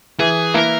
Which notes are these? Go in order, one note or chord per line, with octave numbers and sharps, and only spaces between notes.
E3 G#4
A#3 E4 A#4 B4